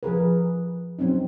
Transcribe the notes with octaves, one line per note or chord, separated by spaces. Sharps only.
F3 G#4 A#4 B4
F#3 C4 C#4 D#4